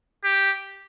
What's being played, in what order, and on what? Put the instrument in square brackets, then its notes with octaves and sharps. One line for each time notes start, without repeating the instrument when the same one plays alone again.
[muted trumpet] G4